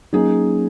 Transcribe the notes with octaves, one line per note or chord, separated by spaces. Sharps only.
F#3 A#3 C#4 D#4 G#4